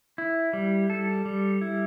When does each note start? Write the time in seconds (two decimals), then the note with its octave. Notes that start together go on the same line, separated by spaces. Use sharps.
0.18 E4
0.53 G3
0.90 A4
1.25 G3
1.61 E4